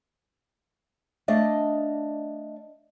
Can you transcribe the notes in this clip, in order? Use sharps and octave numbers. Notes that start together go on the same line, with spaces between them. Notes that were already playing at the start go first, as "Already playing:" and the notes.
A3 D4 D5 D#5 F5